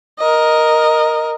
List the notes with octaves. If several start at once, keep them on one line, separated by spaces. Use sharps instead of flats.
A#4 D#5